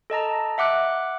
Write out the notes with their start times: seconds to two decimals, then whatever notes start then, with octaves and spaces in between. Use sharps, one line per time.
0.10 A4 D#5 A5 A#5
0.58 E5 F#5 D6 F#6